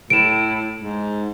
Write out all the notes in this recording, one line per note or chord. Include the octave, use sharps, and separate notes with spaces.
A2 D7 E7
G#2